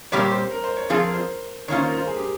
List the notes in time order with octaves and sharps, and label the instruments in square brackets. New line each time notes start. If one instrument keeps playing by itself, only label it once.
[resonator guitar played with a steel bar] A#2 G3 C4 G4 A#4 [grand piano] C#5
[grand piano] C5
A#4
C5
C#5
[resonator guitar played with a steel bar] F3 C4 F4 G#4 [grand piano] C5
[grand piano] A#4
C5
[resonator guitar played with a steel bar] D#3 A#3 C#4 F4 [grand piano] C#5
[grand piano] C5
A#4
C5
G#4
G4